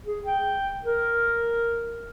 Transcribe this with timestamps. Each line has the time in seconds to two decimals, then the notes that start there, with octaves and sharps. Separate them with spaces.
0.06 G#4
0.26 G5
0.85 A#4